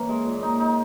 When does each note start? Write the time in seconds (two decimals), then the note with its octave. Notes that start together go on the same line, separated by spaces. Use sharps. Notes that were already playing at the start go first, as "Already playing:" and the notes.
Already playing: E3 A#3 C#4
0.09 G#3
0.25 A#2
0.42 D#4
0.60 D#4